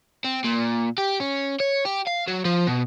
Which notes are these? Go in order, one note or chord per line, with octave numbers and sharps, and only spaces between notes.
C4
A#2
G4
C#4
C#5
G4
F5
F#3
F3
B2